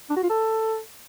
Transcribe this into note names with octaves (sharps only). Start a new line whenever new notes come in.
D4
F#4
F4
A4